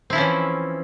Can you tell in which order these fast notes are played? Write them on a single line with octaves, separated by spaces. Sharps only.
C4 E4 F3 C#4 E3